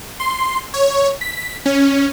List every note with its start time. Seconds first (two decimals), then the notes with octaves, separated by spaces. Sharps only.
0.20 C6
0.74 C#5
1.21 B6
1.66 C#4